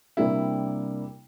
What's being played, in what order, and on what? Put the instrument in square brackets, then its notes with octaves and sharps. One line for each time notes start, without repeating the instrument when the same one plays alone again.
[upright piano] C3 G3 A#3 D4 G4 [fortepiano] E4